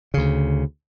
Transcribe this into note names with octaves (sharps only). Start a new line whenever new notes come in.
D2 C#3